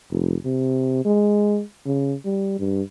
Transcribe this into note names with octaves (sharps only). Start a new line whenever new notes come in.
F1
C3
G#3
C#3
G3
G2